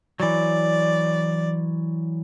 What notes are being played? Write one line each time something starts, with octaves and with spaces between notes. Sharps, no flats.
E3 F#3 D5